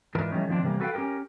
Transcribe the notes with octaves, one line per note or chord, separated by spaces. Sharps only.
G#2 E3 D4 F4 A#4 B4
E3 G3 A3 C#4 D#4
D#3 F3 C4 D4
A2 C3 E3 G3 A#3
F#4 A4 B4 C5 F5 G5
C#4 G4 G#4 A#4 G5